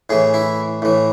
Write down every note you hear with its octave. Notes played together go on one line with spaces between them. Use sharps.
A2 E3 G#4
E4
A2 E3